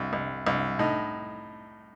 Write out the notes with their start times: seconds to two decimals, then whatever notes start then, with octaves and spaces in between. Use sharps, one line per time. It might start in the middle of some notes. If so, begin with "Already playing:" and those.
Already playing: C2
0.13 C2
0.47 C2
0.79 A2 D#4